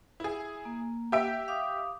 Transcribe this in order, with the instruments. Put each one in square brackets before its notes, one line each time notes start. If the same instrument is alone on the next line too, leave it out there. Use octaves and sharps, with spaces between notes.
[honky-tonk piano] E4 G#4
[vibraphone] A#3
[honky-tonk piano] G4 E5 D7
[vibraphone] F5 D6 D#6